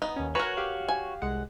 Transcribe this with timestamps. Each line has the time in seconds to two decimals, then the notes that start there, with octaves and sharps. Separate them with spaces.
0.02 B3 D#4
0.16 D#2 C#4
0.35 F#4 A#4 B4 C#5 G#5 A#5 C#6
0.57 G4 F5
0.88 G#5
1.22 C2 G#3 F#5